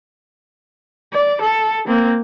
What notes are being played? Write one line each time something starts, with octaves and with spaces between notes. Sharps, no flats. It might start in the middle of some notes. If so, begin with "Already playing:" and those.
D5
A4
A#3 C4